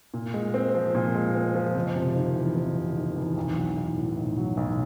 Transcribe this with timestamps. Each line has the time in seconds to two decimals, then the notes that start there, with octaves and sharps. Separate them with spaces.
0.14 A#2
0.34 G#3
0.54 C4
0.75 F3
0.95 A#2
1.15 G#3
1.35 C4
1.55 F3
1.75 F#1
1.96 C3
2.15 D#3
2.36 E2
2.55 F#1
2.76 C3
2.96 D#3
3.16 E2
3.37 B1
3.56 F#3
3.77 B1
3.97 A2
4.17 B1
4.37 F#3
4.57 B1